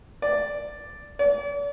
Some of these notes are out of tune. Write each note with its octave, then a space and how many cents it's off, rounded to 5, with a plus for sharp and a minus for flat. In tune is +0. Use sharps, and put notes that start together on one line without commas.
D5 +0
D5 -40